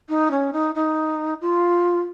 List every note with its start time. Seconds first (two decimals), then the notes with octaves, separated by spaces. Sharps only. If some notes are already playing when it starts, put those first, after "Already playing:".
0.09 D#4
0.31 C#4
0.53 D#4
0.75 D#4
1.41 F4